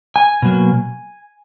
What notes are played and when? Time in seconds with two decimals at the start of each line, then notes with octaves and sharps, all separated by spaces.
0.16 G#5
0.42 B2 F#3 A#3